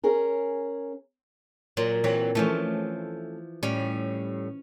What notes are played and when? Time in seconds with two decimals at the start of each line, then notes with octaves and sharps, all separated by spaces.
0.03 C#4 G#4 A#4
1.77 A#2 F#3
2.04 E3 F#3 C4
2.35 E3 F3 A3 C#4
3.63 A2 G3 C#4